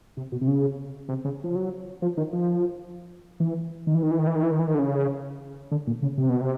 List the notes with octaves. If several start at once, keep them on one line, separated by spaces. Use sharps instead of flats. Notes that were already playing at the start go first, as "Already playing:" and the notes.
C3
B2
C3
C#3
C3
C#3
F3
F#3
F3
D#3
F3
E3
D#3
E3
D#3
E3
D#3
E3
D#3
E3
D#3
E3
D#3
D3
C#3
D3
A#2
C#3
C3
B2
C3